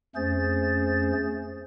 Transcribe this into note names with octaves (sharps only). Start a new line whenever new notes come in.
F2 A3 C#4 G#4 C5 A6